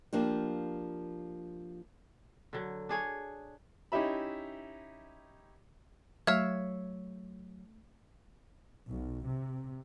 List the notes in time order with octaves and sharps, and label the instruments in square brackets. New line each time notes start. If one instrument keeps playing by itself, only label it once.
[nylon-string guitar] F3 A#3 D4 G4
[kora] D3 F#3
D4 G#4 C#5
[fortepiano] C#4 D#4 E4 G4 E5 B5
[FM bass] F#3 [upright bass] A3 [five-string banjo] C#5 E5 F5 [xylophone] F6 G#6
[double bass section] B1
C3